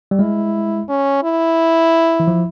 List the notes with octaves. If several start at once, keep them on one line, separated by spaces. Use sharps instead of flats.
G3
G#3 E4
C#4
E4
E3
F3